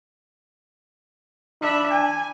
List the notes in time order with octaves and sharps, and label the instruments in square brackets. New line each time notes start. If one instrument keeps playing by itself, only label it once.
[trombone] D4 [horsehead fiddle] E5 B5
[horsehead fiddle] G#5